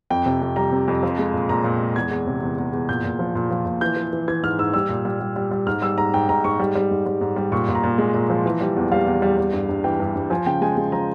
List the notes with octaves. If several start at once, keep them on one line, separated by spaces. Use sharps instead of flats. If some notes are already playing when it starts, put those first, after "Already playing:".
F2 G5
C3
F2
G3 A#5
C3
F2
F3
G#3
A#2
A#2 A#5
A#2
G#3
E2 G#6
E2
C3
E2
E2
E2
A#2 G6
A#2
F3
A#2
F3
A#2
E3 G6
E3
E3
E3 G#6
G#2 F6
G#2 E6
G3 E6
A#2
G3
G3
G3
G3
G#2 F6
G3 E6
G#2 A#5
G#2 G5
G#2 A#5
G#2 C#6
G3
G3
G#2
G3
G#2
G3
A#2 C#6
A#2
A#5
A#2
G#3
A#2
F3
E3
G3
E2
G3 F5
E2
G3
G3
G2
G2
E3 G5
G2
G2
F3 G#5
C#3 G5
G#3 G#5
G#3
F3 A#5